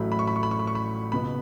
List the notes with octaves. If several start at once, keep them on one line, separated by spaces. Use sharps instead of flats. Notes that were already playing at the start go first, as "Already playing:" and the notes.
Already playing: A1 A2 F#3 A3 B5
B5
C#6
B5
C#6
B5
C#6
B5
C#6
B5
C#2 B2 B3 B5